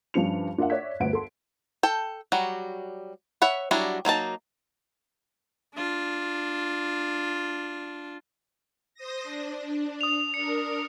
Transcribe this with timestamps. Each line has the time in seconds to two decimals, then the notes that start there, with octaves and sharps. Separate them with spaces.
0.14 G2 F3 C#4 D4 C#7 F7
0.58 D4 F4 A#4 E5 F#5
0.70 C#5 D5 E5 F#6 G#6 B6
1.00 G1 D2 B3 F#5 D7
1.13 A4 C6
1.83 A4 G5
2.32 F#3 G3 F#4
3.42 C#5 E5 F#5 B5
3.71 F#3 G3 D4 E4 F#4
4.05 F#3 A#3 D#4 A5
5.75 D4 F4
8.94 C5 D#6 A#6
9.23 D4
10.01 D#6 F7
10.34 D4 A#4 C#7